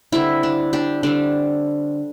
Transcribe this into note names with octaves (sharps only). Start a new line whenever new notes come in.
D3 G3 C4 E4
D4
D4 G4
D3 G3 C4 D4